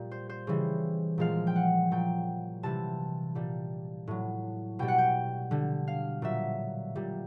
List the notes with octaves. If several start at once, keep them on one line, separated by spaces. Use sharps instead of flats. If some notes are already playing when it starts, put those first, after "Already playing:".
Already playing: A#2 G3
C5
C5
C#3 E3 G3
A#2 F3 G#3 F5
G5
F#5
A#2 F#3 G5
C3 E3 G3 A5
A#2 G3
A2 F#3
B2 G3 G5
F#5
G5
D3 G3
F5
A#2 F#3 E5
A#2 G3